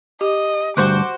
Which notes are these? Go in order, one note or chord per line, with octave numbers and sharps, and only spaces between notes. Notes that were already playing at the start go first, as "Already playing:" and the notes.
G4 D#5
D2 G2 F#4 C5 F#5 D6